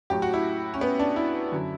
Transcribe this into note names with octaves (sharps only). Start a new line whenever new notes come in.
A2 F#3 A3 G4
F#4
E4
C#4
B3
D4
E4
F#2 D3 F#3